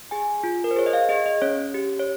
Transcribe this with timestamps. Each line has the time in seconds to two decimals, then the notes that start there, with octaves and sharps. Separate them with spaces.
0.11 G#4 G#5
0.44 F4
0.64 A#4
0.71 C5
0.76 G#4 C#5
0.86 D#5
0.93 F5
1.09 G#4 D#5
1.26 D#5
1.42 C#4 C#5
1.74 G4
1.99 C#5